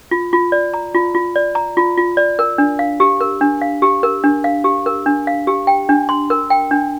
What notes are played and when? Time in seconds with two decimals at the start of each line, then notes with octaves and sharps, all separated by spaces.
0.11 F4
0.33 F4
0.52 D5
0.74 A#5
0.95 F4
1.14 F4
1.36 D5
1.55 A#5
1.77 F4
1.98 F4
2.17 D5
2.39 A#4
2.58 D4
2.79 F5
3.00 G4
3.21 A#4
3.41 D4
3.62 F5
3.82 G4
4.03 A#4
4.23 D4
4.44 F5
4.64 G4
4.86 A#4
5.06 D4
5.27 F5
5.47 G4
5.67 G5
5.89 D4
6.09 C6
6.30 A#4
6.50 G5
6.71 D4